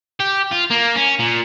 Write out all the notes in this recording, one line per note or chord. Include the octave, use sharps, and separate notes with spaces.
G4
F4
A#3
C#4
A#2